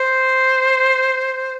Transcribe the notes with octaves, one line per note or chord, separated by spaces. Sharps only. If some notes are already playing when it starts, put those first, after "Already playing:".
Already playing: C5